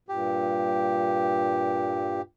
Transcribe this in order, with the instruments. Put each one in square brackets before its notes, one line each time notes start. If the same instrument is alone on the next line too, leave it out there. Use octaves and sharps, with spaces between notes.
[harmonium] G2 A#2 [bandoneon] G4